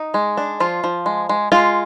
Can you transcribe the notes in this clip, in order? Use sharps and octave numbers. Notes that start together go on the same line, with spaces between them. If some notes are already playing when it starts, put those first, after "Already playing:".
Already playing: D#4
G#3
D4
F3 F4
F3
G#3
G#3
G#3 F4